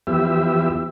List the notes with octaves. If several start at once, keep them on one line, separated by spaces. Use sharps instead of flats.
E2 F3 B3 G4 E5